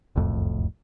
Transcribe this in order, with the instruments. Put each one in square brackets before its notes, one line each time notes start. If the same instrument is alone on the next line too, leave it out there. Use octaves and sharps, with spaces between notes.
[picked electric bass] E1 C2 F2 A2